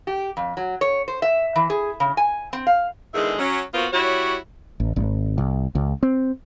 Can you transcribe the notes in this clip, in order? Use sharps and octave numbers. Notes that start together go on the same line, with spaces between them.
G4
F2
F#3
C#5
C5
E5
E3
G#4
C#3
G#5
C4
F5
E2 D3 D#3 G#3 G#4 E5
F#3 C#4
A#3 B3 F4 F#4 C5
G3 E4 F#4 C#5
A1
G#1
C2
C#2
C4